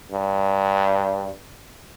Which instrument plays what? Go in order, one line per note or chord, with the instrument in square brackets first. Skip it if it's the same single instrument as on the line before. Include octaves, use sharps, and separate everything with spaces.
[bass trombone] G2